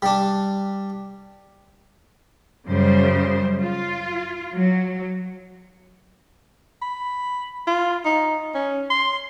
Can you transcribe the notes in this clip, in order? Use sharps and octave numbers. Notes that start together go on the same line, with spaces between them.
G3 D4
F#2 C#3 G3 C5
F4
F#3
B5
F4
D#4
C#4
C6